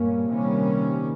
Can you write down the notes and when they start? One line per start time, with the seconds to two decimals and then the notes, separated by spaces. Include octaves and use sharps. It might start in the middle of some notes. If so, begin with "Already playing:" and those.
Already playing: G2 A#3 C#4
0.29 C3 D#3 G3 C#4